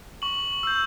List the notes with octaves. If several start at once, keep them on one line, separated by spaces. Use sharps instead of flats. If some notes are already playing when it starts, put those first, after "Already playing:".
C#6 F#7
E6 G6